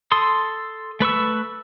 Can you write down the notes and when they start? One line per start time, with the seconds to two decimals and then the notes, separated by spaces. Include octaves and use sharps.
0.12 A4 C6 D#6
1.00 A3 B4 C#6 E6